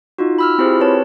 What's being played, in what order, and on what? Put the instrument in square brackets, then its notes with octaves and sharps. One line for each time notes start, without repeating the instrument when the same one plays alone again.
[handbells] D#4 F4 F#4
B5 E6 F6
C4 E4 F4 G4 G#4 C5
C4 B4 C#5 A5